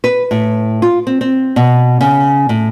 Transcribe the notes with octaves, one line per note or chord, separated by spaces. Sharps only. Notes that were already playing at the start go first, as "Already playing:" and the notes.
B4
A2
F4
C4
C4
B2
C#3
A2